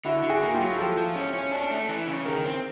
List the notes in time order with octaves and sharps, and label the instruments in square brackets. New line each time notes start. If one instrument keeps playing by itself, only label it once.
[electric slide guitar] D3 [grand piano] E4 F#4
[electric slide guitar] D3
[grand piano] F#4 G#4
[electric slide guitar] A#3
[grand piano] F4 G4
[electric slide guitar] F#3
[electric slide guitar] F3 [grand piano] G4 A4
[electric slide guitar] F3
C#4
C#4
D4
A3
E3
C#3
[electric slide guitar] D#3 [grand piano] G#4 A#4
[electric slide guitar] C4